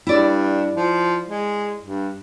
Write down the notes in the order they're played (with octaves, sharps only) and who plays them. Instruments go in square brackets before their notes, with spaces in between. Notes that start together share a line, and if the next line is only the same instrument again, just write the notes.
[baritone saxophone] G2 [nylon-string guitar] E4 D5
[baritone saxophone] F3
G#3
G2